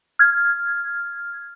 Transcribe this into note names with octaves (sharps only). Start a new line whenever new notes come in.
F6 G#6